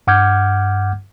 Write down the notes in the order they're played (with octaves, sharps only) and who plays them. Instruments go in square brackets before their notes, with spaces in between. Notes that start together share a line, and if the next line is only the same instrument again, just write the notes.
[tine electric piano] G2 F#5 D6 F6 G6 G#6